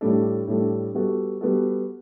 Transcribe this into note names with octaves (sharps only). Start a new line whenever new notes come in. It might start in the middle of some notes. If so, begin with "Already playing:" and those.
A2 G3 D4 A4
A2 G3 D4 A4
G3 B3 F#4 A4
G3 B3 F#4 A4